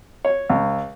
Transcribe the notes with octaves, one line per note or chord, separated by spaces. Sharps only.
C#5
C#2